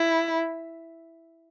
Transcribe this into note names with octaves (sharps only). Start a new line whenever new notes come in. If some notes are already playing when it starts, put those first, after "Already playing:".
Already playing: E4